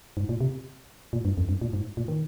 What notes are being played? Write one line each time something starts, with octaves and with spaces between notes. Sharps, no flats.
G#2
A#2
C3
A#2
G2
F2
G2
A#2
G#2
A#2
D#3